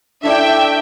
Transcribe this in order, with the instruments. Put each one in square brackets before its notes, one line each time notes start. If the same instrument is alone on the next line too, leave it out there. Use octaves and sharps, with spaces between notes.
[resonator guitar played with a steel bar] A3 E4 D5 [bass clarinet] D4 [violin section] E5 G5